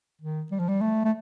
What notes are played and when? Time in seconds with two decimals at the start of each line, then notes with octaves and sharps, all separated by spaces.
0.22 D#3
0.51 G3
0.60 F3
0.69 G3
0.81 A3
1.05 A3